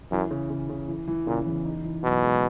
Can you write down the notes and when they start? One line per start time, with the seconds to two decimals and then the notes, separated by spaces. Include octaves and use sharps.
0.12 F#2 E3
0.31 C#3
0.50 C#3
0.69 C#3
0.88 E3
1.08 E3
1.27 A#2 C#3
1.47 E2
1.65 D#4
1.84 E3
2.04 F#2 B2
2.23 G#3